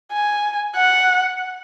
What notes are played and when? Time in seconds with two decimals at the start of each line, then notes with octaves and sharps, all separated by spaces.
0.12 G#5
0.76 F#5